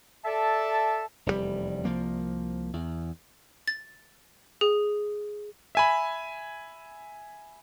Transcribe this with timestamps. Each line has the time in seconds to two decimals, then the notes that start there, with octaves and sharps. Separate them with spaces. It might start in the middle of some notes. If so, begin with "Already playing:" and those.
0.25 A4 D5 E5 A5
1.26 F1 E2 A2 G3
1.85 C2 F3 A#3
2.73 E2
3.68 A6
4.61 G#4
5.75 E5 G#5 B5